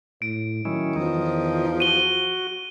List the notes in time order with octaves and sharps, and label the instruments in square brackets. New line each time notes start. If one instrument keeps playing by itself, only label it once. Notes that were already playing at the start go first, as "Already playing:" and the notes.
[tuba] A2 [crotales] D7
[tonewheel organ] D#3 C#4 E4 [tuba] F#3
[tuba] E2 [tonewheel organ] D#3 D#4 [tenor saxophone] F3
[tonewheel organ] F#4 [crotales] D#7 G7